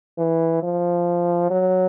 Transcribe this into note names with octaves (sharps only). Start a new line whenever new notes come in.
E3
F3
F#3